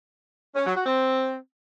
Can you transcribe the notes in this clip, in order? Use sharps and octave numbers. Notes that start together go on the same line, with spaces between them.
C#4
F#3
F#4
C4